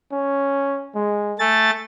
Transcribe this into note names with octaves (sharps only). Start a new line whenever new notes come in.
C#4
G#3
A3 G#5 A6